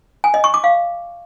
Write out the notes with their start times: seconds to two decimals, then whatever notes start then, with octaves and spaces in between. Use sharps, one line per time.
0.24 G#5
0.34 D#5
0.44 C#6
0.54 D6
0.64 F5